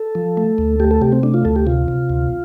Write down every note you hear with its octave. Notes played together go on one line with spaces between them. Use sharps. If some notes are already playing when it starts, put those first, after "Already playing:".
Already playing: A4
F3
A3
D2
A3 G4
A4
C3 G4
C4
A3 D4
F4
D2 A4
G4
C3 F4
C3
D2